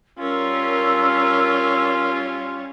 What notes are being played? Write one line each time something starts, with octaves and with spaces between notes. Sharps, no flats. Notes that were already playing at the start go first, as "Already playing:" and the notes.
G3 C#4 F4 A#4 E6